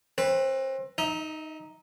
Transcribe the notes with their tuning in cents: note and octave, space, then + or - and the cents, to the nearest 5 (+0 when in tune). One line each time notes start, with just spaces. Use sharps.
C4 +30 B4 +0
D#4 +0 E5 -40